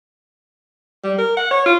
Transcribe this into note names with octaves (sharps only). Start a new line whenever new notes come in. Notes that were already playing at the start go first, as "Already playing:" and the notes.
G3
A#4
F#5
C#5
F4